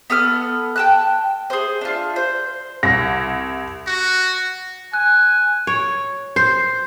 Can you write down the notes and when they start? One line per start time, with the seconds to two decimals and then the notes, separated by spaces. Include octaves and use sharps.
0.10 B3 A4 D#6 F6
0.76 G5 A5 F#6
1.50 G#4 C5
1.81 D4 F4
2.16 C5
2.83 C2 A#6
3.87 F#4
4.93 G#5 F#6
5.67 C#5
6.36 C5